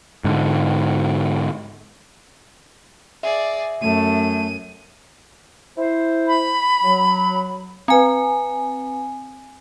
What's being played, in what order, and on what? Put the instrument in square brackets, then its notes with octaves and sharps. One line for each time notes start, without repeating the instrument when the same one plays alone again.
[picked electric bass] G#2 D3
[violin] G#4 D5 [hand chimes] E5
[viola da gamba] F#2 [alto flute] A3 [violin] D#7
[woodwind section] E4 C5
[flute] B5
[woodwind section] F#3
[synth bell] C4 G#5 [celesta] B4 A#5